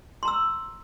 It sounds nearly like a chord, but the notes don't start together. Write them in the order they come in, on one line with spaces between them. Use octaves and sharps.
C6 A#5 E6